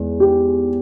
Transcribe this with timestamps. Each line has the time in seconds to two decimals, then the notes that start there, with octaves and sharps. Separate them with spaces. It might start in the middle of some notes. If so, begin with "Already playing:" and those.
Already playing: E2 G#3
0.20 G4